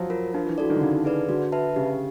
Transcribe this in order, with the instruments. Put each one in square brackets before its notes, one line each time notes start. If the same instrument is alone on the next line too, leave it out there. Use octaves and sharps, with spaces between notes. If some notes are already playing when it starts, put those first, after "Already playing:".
Already playing: [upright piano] F3 F#3
[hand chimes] F4 A#4
[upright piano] F3 [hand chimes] D4
[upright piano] E3
[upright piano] E3 [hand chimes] F#4 A4 D5
[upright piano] D#3
D3
[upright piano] C#3 [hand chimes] D#4
[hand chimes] G#4 B4 D5
[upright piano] D3 [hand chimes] F#4
[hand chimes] B4 E5 A5
[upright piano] C#3 [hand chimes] G4